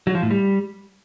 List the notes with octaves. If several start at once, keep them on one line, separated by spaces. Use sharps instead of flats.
F#3
F3
A2
G3